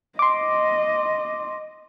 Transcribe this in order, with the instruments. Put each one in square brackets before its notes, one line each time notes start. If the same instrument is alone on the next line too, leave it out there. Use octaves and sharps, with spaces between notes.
[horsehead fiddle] D#5 [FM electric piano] C6 D6